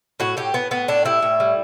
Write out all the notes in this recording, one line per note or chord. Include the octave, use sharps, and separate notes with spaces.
A2 F#4
A2 G4
A2 B3
A2 B3
A2 D4
G3 E4
A2
G3